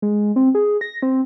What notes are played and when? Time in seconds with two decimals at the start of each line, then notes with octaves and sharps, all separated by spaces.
0.02 G#3
0.36 C4
0.55 G#4
0.81 A#6
1.02 C4